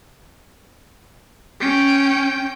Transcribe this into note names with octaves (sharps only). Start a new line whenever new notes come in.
C#4 G5